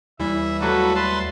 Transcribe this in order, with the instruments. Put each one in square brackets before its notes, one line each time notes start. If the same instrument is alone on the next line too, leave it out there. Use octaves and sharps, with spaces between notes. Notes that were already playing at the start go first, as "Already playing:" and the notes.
[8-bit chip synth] D#2 G3 [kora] E3 [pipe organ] E5
[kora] F#3 A3 A#3 [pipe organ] F#4 A4 B4
[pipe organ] B4 A5 C6